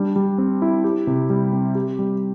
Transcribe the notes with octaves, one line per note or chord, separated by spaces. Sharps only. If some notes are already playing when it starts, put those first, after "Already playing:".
Already playing: G3 D4
G3
C4
E4
G4
C3
G3
C4
G4
G3